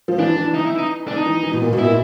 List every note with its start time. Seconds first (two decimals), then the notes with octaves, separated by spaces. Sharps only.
0.08 F3
0.18 E3 D4
0.36 E3
0.54 D#4
0.66 E4
0.78 D#4
1.08 D4
1.16 D#4
1.26 E3
1.43 E3
1.53 B2
1.62 A#2
1.73 B2
1.79 E4
1.85 A#2